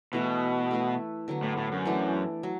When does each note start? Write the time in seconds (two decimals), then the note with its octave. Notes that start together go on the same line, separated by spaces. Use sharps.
0.13 B2 E3 A3 E4
0.71 A3 E4 B4
1.28 D3 F#3 B3
1.43 A2
1.57 A2
1.72 F#2
1.85 E3 A3 D4
2.43 F#3